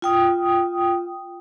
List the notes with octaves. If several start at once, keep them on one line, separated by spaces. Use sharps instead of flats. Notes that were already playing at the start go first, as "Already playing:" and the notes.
F4 G5 D#6